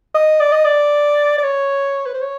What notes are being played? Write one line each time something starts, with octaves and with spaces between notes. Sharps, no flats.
D#5
D5
D#5
D5
D5
C#5
B4
C5
C#5